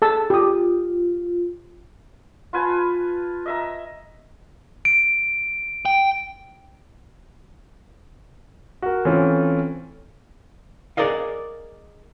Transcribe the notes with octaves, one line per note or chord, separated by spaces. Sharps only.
G#4 A4 A5 E6
F4 G4 D#6
F4 B4 G#5 A5
D#5 E5 A#5
D7
G5
F#4 A#4
E3 A3 C4 C#4 F4
G#4 A#4 D5 D#5 F5